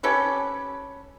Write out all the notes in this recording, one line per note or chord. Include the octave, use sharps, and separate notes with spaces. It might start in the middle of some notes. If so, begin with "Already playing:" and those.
C#4 G4 A4 B4